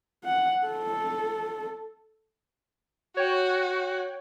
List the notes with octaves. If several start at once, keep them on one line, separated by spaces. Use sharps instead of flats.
F#5
A4
F#4 C#5 G5